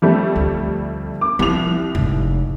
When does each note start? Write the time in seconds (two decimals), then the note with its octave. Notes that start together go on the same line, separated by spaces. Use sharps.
0.02 F2 G3 A3
0.36 D2
1.21 D6
1.39 C2 F3 C4 F7
1.95 F1 G#2